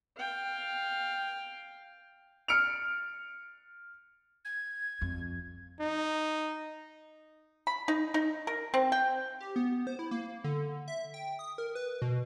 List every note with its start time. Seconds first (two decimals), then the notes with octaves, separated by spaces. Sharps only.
0.17 F5 G5
2.48 F6 C#7 D7 F7
4.45 G#6
5.01 F2
5.80 D#4
7.67 B5
7.88 D#4
8.14 D#4
8.47 A#4
8.74 C4
8.92 G5
9.40 G4
9.56 B3
9.87 C5
9.99 E4
10.11 A#3
10.44 D3
10.88 E5
11.14 G5
11.39 D#6
11.58 A#4
11.75 B4
12.02 B2